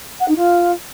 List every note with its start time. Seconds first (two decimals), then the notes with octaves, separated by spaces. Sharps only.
0.20 F#5
0.28 D#4
0.36 F4